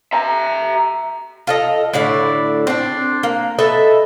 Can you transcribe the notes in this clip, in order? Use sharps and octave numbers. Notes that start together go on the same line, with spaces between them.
E5 A#5
F4 A4 D#5
A2 D3 E4 D5
C4 D4
A#3
A4 B4 D#5 E5